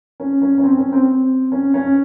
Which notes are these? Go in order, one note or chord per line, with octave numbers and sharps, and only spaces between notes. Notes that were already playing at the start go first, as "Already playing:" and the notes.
C#4
C#4
C#4
C4
C#4
C4
C#4
C#4